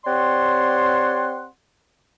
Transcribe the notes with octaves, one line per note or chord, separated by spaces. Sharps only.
C4 G4 C#5 D5 F#5 C6